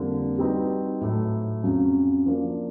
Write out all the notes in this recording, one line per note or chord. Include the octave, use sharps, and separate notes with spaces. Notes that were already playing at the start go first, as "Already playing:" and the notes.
Already playing: F2 D3 G3 A#3
G3 C4 D#4 F#4 B4
A2 F#3 A3
F2 C#3 F#3
F3 A#3 D4